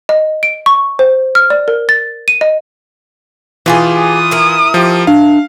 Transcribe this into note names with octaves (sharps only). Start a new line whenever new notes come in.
D#5
D7
C#6
C5
F6
D5
A#4
A6
D#7
D#5
B2 E3 F4 G4 G#4
D#6
E4 A#4
F3 G4
D4 F5